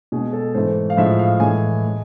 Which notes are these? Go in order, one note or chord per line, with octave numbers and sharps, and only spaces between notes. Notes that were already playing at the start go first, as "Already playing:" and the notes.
B2 G#3 G#4
A4
G#2 E3 A3 C5
F5
A2 F3 G#3 E5
F5
A2 E3 G#3 G#5
G#3